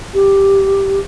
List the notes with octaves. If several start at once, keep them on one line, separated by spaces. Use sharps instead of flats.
G4